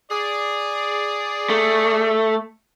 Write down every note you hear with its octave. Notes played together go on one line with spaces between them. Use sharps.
G#4 D5
A3